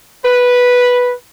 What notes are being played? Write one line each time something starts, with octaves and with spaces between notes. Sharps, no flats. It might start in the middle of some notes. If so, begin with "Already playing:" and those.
B4